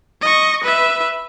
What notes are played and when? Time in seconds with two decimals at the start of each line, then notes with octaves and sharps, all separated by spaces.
0.21 D#5 C#6
0.63 B4 E5